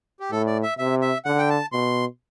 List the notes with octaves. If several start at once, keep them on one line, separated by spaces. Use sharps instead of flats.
G4
A2 A4
D5
E5
C3 E5
E5
D3 F#5
G5
A5
B2 C6